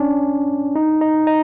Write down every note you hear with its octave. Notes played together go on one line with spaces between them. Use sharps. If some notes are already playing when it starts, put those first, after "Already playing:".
Already playing: C#4 D4
D#4
D#4
D#4